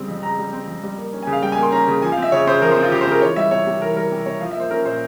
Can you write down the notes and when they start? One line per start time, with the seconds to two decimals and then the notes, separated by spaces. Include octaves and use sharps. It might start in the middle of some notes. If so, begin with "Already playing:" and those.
Already playing: C#3 G3 C4
0.08 F2
0.23 C#3 A#5
0.39 G3
0.53 C4
0.68 F2
0.83 G3
0.98 A#3
1.13 C#4
1.23 G#5
1.27 C#3
1.33 F5
1.42 G3 G5
1.52 G#5
1.58 A#3
1.63 C6
1.72 C#4 A#5
1.88 C#3
2.02 F3 G#5
2.12 F5
2.17 C4 E5
2.32 C#3 C#5
2.47 C#3 C5
2.62 F3 A#4
2.72 C5
2.77 C4
2.82 F4
2.92 C#3 G4
3.01 C5
3.07 C#3 A#4
3.21 E3 C#5
3.36 G3 E5
3.51 C3 C#5
3.66 C3
3.81 E3 A#4
3.96 G3 A#4
4.12 C3
4.26 C3 C#5
4.41 F3 F5
4.51 E5
4.55 A#3 C5
4.71 C#4 A#4
4.85 A#2 C5